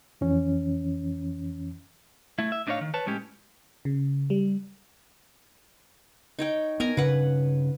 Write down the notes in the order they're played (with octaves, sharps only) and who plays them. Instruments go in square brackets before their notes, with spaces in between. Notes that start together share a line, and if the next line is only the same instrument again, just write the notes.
[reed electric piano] F2 E3 C#4
[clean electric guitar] A3 E4
E5
A2 D4 D#4 B4 C#5 F5
D#3
B4 C#5 A5
A2 G#3 C#4 G4
[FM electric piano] C#3
G3
[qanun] D#4 C#5 G5
[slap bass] B3 [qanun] A#4 G#5 A#5
[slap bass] G2 C#3 [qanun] B4 F#5